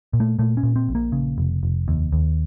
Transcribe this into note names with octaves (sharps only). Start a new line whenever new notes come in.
A#2
A3
A#2 A3
C#4
A#2
C4
A#1
A#3
C#3
F1
F1
D#2
D#2